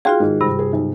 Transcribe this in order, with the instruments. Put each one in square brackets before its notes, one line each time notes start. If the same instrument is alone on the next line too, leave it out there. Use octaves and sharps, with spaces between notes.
[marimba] F4 F#4 G#4 [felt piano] F5 G5 C6
[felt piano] G#2 D#3
[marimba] G2 C3 G3
[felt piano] G#4
B1